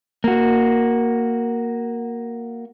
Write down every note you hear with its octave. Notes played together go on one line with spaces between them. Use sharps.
A#3 F#4